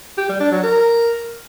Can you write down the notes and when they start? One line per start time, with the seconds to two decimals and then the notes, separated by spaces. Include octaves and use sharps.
0.18 G4
0.29 G3
0.40 D4
0.52 F#3
0.63 A#4